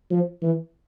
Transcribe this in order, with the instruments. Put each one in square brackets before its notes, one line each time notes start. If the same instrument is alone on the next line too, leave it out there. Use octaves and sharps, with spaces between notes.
[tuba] F3
E3